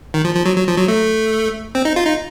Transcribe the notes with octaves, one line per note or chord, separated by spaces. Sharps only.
D#3
F3
F3
F#3
F#3
F3
F#3
A3
C4
D#4
F4
D#4